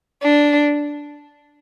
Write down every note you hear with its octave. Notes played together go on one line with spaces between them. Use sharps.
D4